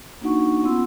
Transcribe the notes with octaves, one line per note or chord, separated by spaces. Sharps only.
A#3 D4 D#4 F#4 F#5 C#6
B3 C#4 F4 F#5 C6 E6